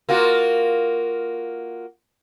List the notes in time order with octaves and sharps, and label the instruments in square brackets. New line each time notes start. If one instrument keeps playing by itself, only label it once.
[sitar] A#3 F4 F#4